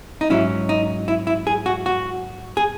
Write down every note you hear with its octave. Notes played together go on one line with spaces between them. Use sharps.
D#4
G#2 F#3 C#4 E4
D#4
E4
E4
G#4
F#4
F#4
G#4